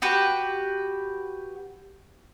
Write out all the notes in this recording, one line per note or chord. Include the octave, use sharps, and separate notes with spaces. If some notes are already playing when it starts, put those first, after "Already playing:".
F#4 G4 B4